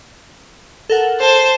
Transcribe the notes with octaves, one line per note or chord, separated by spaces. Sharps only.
A4 A#4 F#5
C5 A5